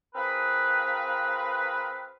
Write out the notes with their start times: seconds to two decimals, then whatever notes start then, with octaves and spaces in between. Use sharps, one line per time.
0.15 C4 F4 G#4 A#4 B4